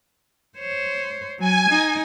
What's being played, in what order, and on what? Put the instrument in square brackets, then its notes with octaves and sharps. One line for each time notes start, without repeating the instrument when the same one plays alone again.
[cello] C5 C#5
[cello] F#3 [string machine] G#5
[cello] D#4